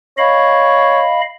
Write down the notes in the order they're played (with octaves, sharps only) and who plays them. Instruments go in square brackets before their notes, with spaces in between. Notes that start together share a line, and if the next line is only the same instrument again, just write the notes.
[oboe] C#5 [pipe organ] D#5 F5 B5